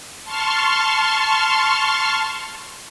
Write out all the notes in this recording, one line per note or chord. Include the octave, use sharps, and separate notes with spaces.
A5 C6 C#6 F6